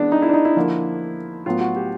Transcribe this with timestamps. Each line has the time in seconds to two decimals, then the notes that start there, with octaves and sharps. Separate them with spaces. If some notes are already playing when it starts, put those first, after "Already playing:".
Already playing: C#3 E3 G#3 B3 D4
0.12 D#4
0.22 E4
0.29 D4
0.34 D#4
0.45 E4
0.56 D3 F3 A#3
1.46 A2 F#3 B3 F4
1.61 F#4
1.76 G4